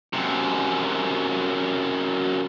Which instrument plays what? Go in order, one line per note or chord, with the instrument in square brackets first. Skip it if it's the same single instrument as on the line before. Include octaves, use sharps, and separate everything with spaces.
[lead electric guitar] F#2 C3